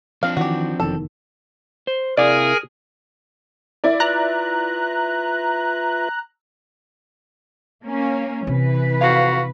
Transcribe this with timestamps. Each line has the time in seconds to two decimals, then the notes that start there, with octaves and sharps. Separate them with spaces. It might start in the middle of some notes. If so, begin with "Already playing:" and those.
0.23 F3 C4 D4 F5
0.37 D#3 E3 F#4 G4
0.80 F1 E2 D#3 A4
1.87 C5
2.17 C3 E4 G#4 A#4 D5 F5 G#5
3.84 E4 A#4 D5
4.00 F4 B4 E5 A#5 F#6
7.85 A#3 C#4
8.47 C3 E3 B4
9.01 F2 F#4 F5